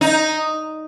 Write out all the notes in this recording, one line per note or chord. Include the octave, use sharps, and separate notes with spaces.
D#4